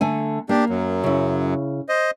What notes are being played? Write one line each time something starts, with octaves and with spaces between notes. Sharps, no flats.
D3 A3 G#5
A#3 D4 G4
F#2 F#3
C#3 E4
C5 D#5